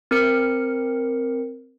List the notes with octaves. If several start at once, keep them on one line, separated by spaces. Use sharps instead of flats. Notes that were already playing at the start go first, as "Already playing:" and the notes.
C4 A#4 C#7